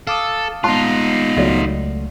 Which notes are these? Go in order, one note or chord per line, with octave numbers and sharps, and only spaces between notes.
A4 F5 D6 D#6
G#3 B3 D#4 F4 A5 C6 F#6
C#2 F#3 A3 F#4 D5